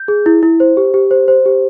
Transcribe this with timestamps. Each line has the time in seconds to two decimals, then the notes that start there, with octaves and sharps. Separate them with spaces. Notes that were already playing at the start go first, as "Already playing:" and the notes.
Already playing: G6
0.08 G#4
0.26 E4
0.43 E4
0.60 C5
0.77 G4
0.94 G4
1.11 C5
1.28 C5
1.46 G4